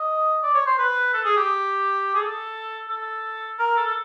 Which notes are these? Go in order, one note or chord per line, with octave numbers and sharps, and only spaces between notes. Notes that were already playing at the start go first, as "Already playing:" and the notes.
Already playing: D#5
D5
C#5
C5
B4
A4
G#4
G4
G#4
A4
A4
A#4
A4
A4